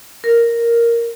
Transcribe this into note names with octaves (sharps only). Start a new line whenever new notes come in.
A#4